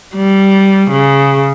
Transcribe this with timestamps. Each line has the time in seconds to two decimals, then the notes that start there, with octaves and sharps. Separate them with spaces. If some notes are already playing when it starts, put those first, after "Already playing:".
0.15 G3
0.91 C#3